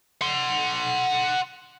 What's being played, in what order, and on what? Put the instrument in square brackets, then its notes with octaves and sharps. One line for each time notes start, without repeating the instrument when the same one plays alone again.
[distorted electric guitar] F#5 C6